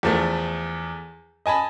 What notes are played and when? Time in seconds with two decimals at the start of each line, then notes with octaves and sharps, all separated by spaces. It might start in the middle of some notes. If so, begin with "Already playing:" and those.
0.03 E2 F3 A3
1.46 D#5 G#5 A5 B5